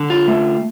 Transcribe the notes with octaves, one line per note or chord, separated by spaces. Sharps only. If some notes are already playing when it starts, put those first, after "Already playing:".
Already playing: D3
F4
A3